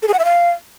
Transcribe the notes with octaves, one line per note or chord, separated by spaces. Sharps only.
A4
G#4
F#5
E5
F5